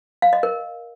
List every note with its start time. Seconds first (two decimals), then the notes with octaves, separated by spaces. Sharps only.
0.22 F5
0.33 D#5
0.43 A#4